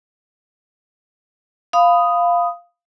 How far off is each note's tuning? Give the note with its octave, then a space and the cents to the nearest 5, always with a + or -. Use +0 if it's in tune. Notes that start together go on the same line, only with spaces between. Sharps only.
F5 +0 B5 +15 D#6 +0